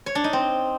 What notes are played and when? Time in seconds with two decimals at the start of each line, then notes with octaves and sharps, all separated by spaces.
0.06 C#5
0.15 D4
0.24 D#4
0.33 C4